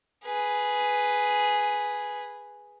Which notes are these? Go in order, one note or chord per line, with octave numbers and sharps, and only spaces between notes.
G#4 B4